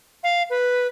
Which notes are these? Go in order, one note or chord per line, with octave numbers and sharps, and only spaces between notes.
F5
B4